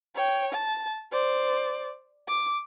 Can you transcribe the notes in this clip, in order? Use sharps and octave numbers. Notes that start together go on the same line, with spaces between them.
C#5 G5
A5
C5 D5
D6